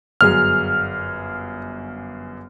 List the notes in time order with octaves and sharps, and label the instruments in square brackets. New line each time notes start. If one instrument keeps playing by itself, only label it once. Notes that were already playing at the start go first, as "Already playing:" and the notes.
[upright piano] G1 F#2 G#4 [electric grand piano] F6